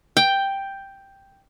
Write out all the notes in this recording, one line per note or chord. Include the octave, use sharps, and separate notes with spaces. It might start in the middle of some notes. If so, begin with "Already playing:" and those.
G5